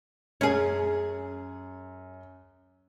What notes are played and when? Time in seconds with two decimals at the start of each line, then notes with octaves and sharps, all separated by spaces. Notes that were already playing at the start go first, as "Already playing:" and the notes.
0.41 F#2 C#4 G#4